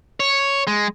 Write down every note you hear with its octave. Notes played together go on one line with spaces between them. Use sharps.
C#5
G#3